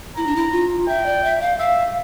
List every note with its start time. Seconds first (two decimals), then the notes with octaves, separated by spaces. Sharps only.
0.17 E4 A#5
0.26 D4
0.36 E4
0.52 F4
0.88 E5 G5
1.06 D5
1.24 E5
1.41 F5
1.59 E5 F5